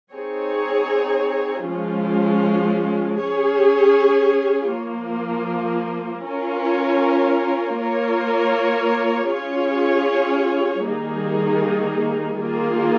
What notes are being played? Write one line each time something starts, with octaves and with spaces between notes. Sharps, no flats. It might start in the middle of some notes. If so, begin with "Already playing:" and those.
C4 D#4 G#4 C#5
F3 G#3 C#4 F4
C#4 G#4 C#5
F3 A#3 F4
C#4 F4 A#4 C#5
A#3 F4 A#4 C#5
C#4 F4 G#4 C#5
D#3 G3 A#3 D#4 G#4
D#3 A#3 F4 G#4